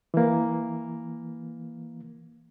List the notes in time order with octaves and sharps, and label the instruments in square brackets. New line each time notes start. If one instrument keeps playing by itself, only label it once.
[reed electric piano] E3 A#3